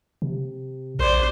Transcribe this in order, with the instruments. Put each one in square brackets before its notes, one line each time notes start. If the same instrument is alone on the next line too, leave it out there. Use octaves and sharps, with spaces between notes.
[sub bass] C3
[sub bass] A#1 [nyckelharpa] C5 D5